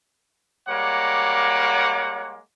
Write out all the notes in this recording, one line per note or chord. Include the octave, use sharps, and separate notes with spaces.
G3 G#3 A#3 C#5 F#5 D6